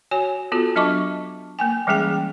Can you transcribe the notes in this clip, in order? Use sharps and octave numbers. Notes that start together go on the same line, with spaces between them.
F#4 C#5 G#5
B3 F4 F#4 A4
F#3 D4 D#5 A5 C#6 D6
A#3 G5 G#5
E3 G3 G#3 C#4 G#4 G5